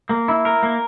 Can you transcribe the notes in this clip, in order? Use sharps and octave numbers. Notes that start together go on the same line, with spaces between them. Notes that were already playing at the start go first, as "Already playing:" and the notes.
A#3
E4
A#4
A#3